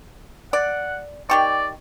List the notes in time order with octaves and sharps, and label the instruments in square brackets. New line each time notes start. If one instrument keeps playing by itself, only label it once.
[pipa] D5 [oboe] F#5
[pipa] D#3 G4 C#6 [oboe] D5